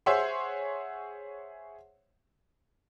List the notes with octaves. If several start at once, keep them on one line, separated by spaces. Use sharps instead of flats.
G#4 C5 C#5 E5 F#5 C6